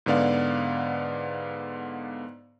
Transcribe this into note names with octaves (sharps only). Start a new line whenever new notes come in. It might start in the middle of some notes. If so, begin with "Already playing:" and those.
G#2 D3 B3 D5 F5